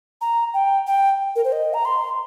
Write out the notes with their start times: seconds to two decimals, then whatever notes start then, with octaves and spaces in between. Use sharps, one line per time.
0.21 A#5
0.54 G5
0.87 G5
1.36 A#4
1.44 C5
1.52 D#5
1.74 A#5
1.85 C6